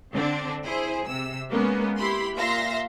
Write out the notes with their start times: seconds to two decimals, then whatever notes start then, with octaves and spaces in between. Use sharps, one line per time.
0.13 D3 C4 D4
0.64 E4 G#4 C5
1.06 C3 E6
1.49 G#3 A#3 B3 C#4
1.99 E4 G4 B5 C6
2.36 A#2 E5 F5 C6 A#6